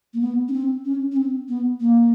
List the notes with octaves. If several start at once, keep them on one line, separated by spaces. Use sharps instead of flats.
A#3
B3
C#4
C4
C#4
C#4
C4
B3
A#3